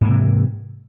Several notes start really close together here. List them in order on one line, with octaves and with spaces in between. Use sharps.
G#2 A#3 C3 E3